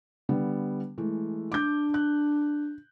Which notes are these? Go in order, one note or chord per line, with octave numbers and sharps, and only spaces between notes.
D3 G3 B3
E3 G#3 A3
D4 D6 G6
F#6